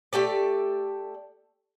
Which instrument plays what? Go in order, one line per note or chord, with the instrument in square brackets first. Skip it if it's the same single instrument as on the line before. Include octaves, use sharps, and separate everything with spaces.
[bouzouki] A3 G4 A4 D5